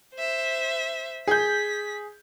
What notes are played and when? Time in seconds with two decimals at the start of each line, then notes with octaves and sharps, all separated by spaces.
0.15 C5 E5
1.28 G#4 G6 B6